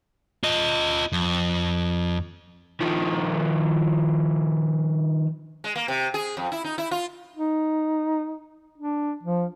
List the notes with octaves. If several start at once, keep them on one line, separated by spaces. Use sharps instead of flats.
F4 D#5
F2
D#3 F3
G#3
A#3
C3
G#4
F2
E4
D#4
E4
F4
D#4
D4
F3